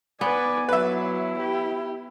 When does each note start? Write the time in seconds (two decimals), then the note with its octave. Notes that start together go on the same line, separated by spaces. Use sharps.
0.21 B3 B4 D5 G#5
0.69 F#3 E4 B4 E5
1.40 G4